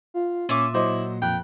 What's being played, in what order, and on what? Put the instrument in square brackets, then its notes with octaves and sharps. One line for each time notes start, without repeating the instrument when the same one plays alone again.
[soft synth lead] F4
[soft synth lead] A#2 [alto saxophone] C#4 [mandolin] F4 E5 D6
[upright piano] F#3 C5 D#5 [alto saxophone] E4
[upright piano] F2 F#6 [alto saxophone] G5